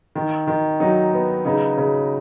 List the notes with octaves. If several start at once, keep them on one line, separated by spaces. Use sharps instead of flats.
D#3
D#3
F#3 D#4
B3
C#3 D#4
C#3